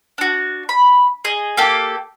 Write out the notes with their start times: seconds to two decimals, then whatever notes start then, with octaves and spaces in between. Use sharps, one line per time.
0.18 D4 F#4
0.69 B5
1.25 G#4 D#5
1.57 A#3 G4 A4